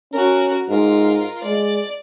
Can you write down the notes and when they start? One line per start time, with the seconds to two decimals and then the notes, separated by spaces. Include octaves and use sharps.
0.13 C#4 F#4 A#4
0.69 G#2 F4 A#4
1.44 G#3 D5